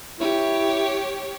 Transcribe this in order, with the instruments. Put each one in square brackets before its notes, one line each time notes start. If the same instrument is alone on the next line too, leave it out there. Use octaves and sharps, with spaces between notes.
[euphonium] E4 [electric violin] G4 C#5